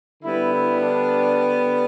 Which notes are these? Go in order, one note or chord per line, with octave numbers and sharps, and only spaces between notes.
D3 G3 B3 E4
E4
D4